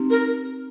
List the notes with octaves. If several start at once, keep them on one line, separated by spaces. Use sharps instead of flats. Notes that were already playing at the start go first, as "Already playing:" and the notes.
Already playing: C4 D#4 G4
A#4